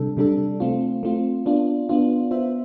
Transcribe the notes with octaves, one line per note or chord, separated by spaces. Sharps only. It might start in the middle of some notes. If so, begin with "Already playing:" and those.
Already playing: C3 G3 D4 A4
C3 G3 D4 A4
A3 C4 F4
A3 C4 F4
B3 D4 F4
B3 D4 F4
B3 F4 C5 E5